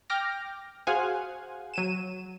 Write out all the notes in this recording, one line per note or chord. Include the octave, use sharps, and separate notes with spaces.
G5 D6 F6 A#6
F#4 G#4 C5 F5 F#5 G#5
F#3 D#7 E7